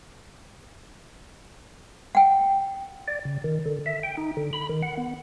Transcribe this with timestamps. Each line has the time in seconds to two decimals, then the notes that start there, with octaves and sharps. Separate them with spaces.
2.15 F#5 G5
3.08 D5
3.25 C#3
3.44 D#3
3.66 D3
3.86 E5
4.03 G5
4.17 D#4
4.37 D3
4.53 B5
4.69 D#3
4.83 F#5
4.97 B3